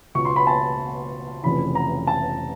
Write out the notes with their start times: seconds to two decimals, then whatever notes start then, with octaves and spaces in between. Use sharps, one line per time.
0.15 C#2 B2 C#6
0.25 C6
0.36 B5
0.47 A5
1.43 F1 F2 C#3 E3 B5
1.75 A#5
2.07 A5